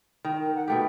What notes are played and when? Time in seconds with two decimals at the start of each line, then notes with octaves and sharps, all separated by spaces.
0.25 D#3
0.41 A#4
0.55 F#5
0.68 B2 A3 G4 G5